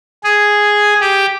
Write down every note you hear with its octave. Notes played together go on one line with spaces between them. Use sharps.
G#4
G4